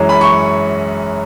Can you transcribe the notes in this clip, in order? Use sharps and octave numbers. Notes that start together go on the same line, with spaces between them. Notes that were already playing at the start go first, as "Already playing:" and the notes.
Already playing: F#2 E3 G#3 C#4
B5
C#6